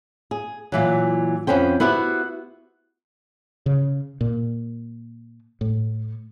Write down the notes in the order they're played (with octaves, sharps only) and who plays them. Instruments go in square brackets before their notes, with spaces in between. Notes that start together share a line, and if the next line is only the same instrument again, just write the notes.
[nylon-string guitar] G#4
A#2 E3 F#3
F2 B3 C#4 C5 G5
B3 E4 F#4 G4 C5
[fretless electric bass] C#3
A#2
A2